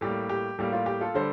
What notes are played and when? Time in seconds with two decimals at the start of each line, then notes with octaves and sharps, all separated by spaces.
0.01 A2 G3 A#3 G4
0.29 G4
0.59 A2 G3 A#3 G4
0.73 F4
0.86 G4
1.01 F4 A4
1.14 D3 G3 A4 C5